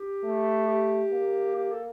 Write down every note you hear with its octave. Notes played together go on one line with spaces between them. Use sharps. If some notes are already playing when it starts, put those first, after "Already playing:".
Already playing: G4
A3
G4
A#3
G4
A4